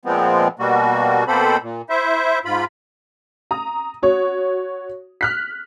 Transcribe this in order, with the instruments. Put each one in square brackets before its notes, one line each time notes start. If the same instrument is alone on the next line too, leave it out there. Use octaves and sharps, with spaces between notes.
[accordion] A#2 F3 G#3 B3 C4
B2 G3 A#3 F#4
B2 A#3 C4 A4 C5 B5
A#2
E4 C5 E5
G#2 F4 B5
[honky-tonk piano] A#5 D#6
F#4 C#5
F6 F#6 B6